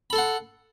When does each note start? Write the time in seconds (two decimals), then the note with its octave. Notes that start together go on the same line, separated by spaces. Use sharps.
0.10 B5
0.13 A4
0.15 C6
0.18 F#5